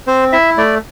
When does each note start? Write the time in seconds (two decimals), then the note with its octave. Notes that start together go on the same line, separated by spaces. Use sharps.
0.07 C4 C5
0.33 E4 E5
0.58 A3 D5